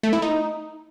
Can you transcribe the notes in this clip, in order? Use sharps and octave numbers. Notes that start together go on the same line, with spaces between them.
A3
E4
D#4